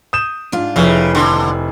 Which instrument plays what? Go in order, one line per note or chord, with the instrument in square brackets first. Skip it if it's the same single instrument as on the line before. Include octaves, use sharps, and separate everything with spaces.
[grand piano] D#6 G6 E7
[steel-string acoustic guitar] G#2 D4 F4
[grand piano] F1 E4 B4 [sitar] C#3 [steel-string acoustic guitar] F3 E5
[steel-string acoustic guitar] D#2 [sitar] D3